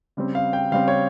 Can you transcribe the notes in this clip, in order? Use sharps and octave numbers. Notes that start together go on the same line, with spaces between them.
C#3 G3 C4
F5
G5
C#3 G3 C4 F5
C#5